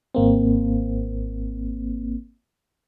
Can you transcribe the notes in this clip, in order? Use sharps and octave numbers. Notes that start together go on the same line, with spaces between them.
G#1 A#3 C4